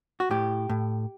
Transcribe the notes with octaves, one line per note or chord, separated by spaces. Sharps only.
F#4
A2 G4
A2